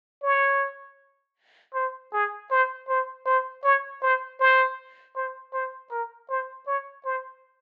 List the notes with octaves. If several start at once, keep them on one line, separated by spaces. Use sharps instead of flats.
C#5
C5
G#4
C5
C5
C5
C#5
C5
C5
C5
C5
A#4
C5
C#5
C5